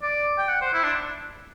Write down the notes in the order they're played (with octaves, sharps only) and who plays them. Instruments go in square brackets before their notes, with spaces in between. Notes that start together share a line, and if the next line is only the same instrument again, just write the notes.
[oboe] D5
G5
F#5
C5
E4
D4